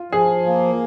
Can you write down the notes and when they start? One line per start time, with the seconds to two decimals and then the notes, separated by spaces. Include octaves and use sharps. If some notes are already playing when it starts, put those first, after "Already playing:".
Already playing: F4
0.12 F3 G#4
0.47 A#3